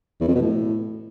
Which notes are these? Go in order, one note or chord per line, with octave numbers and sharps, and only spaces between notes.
E2
F2
B2
A2